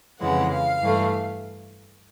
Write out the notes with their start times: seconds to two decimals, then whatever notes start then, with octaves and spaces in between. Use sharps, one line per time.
0.20 F2 C#3 E3 G#3 F#5
0.51 F5
0.80 G2 E3 A3